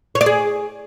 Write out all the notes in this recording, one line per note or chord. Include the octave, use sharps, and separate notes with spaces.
C#5
D5
G#4